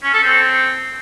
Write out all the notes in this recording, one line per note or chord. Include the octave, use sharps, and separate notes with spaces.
C#4
A4
C4